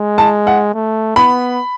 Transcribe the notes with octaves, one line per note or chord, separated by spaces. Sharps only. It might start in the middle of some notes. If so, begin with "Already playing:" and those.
Already playing: G#3
A5
F#5
A3
B3 B5